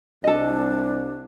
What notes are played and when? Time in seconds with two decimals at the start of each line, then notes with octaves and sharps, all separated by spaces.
0.24 C2 D4 A4 D#5